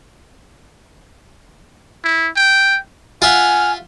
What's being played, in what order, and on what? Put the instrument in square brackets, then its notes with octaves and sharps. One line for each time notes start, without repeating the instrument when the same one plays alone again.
[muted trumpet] E4
G5
[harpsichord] F4 E5 [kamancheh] F#5 F6 [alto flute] G#5